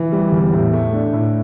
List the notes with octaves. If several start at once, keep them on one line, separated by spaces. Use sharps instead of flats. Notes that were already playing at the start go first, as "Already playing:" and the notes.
Already playing: E3
G3
E2
A2
A3
D4
A2